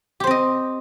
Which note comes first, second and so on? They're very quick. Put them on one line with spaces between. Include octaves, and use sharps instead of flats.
G4 C5 C4 D#5